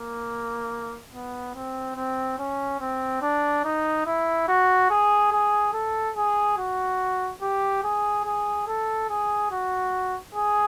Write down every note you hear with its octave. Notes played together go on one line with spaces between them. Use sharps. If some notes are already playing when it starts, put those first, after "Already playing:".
Already playing: A#3
B3
C4
C4
C#4
C4
D4
D#4
E4
F#4
G#4
G#4
A4
G#4
F#4
G4
G#4
G#4
A4
G#4
F#4
G#4